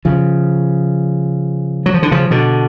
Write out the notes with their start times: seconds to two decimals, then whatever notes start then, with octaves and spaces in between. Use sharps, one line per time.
0.05 C#3 F3
1.86 F#3
1.94 F3
2.03 D3
2.11 C#3 F3
2.31 B2 D3